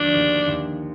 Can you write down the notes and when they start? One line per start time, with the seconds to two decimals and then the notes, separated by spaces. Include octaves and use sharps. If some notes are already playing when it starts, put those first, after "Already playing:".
Already playing: D#2 D3 F3 D4
0.15 D#2
0.47 D#2